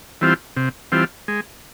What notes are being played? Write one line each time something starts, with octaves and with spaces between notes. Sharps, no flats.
E3 G3 C4 F4
C3
E3 G3 C4 F4
G#3